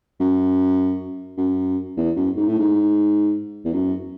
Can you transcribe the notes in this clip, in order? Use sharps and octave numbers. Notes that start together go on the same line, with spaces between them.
F#2
F#2
E2
F#2
G#2
A2
G#2
E2
F#2